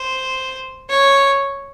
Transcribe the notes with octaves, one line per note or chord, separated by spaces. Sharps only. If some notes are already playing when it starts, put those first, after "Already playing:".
Already playing: C5
C#5